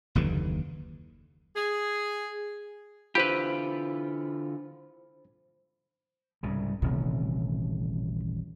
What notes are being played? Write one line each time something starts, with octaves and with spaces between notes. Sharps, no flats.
F#1 D#2 D3 E3
G#4
D3 E4 F4 G4 B4 C5 B5
C2 G#2 C#3
D#1 A1 D#2 C3